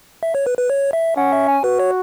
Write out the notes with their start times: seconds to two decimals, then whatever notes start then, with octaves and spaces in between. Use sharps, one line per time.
0.23 E5
0.35 C#5
0.47 B4
0.58 B4
0.70 C#5
0.93 E5
1.16 C#4 F#5
1.33 E5
1.48 G#5
1.64 F#4 B4
1.80 C#5